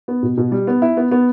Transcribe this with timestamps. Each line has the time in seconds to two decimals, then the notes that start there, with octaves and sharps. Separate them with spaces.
0.08 B3
0.23 B2
0.37 B2
0.52 G3
0.67 B3
0.82 E4
0.97 B3
1.11 B3